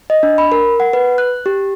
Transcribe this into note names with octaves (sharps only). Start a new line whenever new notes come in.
D#5
D4
B5
A#4
F#5
B4
F#6
G4